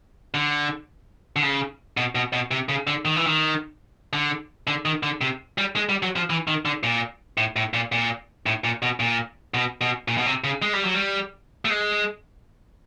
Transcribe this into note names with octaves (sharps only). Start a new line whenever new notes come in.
D3
D3
C#3
B2
B2
B2
C3
C#3
D3
D#3
E3
D#3
D3
D3
D#3
D3
C3
G3
G#3
G3
F#3
F3
E3
D#3
D3
A#2
A2
A2
A#2
A#2
A2
A#2
B2
A#2
B2
B2
A#2
B2
C3
C#3
G#3
G3
F#3
G3
A3
G#3